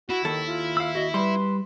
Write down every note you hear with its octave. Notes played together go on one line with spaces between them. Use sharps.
E4 F#4
D#2 D#3 A4
F4
F5 E6
F#4 D#5
G3 B4 B5 C6